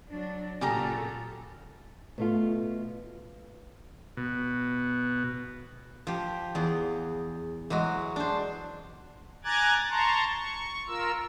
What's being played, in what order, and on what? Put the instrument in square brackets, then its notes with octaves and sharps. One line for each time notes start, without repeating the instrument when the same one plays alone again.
[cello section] F#3 D4
[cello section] A#2 F#4 A4 [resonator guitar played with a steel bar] C#3 G4 A#5
[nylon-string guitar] B2 A3 F4
[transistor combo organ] B2
[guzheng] F3 G4
E2 G#4
E3 F#3 G#3 F#4
D4 C5
[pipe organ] G#5 A#5 D6 F#6 G#6 A6
A5 A#5 C6 C#6
C#6
F4 A#4 E6